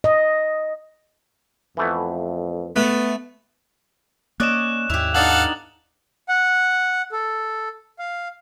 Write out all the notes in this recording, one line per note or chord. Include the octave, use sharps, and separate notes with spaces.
D#5
F2 E3 A3 B3
A3 B3
A#3 C#4 D5 D#5 F#6 E7
D#2 G#2 E4 G4 F7
B3 D4 D#4 A4 F5 F#5 A6 F#7
F#5
A4
F5